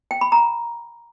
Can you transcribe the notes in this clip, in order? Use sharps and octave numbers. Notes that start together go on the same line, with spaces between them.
G5
B5
A#5